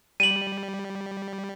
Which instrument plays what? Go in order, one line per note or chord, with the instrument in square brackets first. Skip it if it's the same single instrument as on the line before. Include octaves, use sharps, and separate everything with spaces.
[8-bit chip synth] G3 [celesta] D#7 F#7